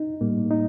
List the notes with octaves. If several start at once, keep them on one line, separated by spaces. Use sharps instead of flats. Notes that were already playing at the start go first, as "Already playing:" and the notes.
Already playing: D#4
A2 G3 A#3
D#4